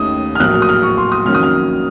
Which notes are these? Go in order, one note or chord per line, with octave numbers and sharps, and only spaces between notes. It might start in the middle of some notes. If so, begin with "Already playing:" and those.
Already playing: D#2 D#3 A3 C#4 D#6
F6
A#1 A2 F#3 A#3 F#6
F6
D#6
F6
C#6
C6
D#6
F2 D#3 F#3 A#3 C#4 F6
D#6
F6